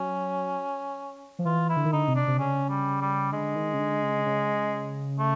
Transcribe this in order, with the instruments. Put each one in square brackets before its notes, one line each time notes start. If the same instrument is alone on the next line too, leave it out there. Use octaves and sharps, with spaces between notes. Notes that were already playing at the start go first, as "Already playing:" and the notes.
Already playing: [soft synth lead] F#3 [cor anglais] C#4
[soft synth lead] F3
[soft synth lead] E3 [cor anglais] F4
[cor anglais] E4
[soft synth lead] D3
D#3
[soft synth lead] D3 [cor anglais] D#4
[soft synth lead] C3
[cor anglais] D4
[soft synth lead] C3
[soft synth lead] C#3 [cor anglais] C#4
[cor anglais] G3
G3
[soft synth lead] D3 [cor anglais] G#3
[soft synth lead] D#3
C#3
D3
C#3
C#3
[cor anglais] A3